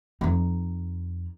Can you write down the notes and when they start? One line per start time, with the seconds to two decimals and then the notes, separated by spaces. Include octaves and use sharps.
0.21 F2 D#4